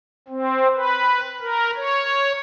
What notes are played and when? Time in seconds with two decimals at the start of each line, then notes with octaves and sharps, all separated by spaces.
0.28 C4
0.74 B4
1.41 A#4
1.76 C#5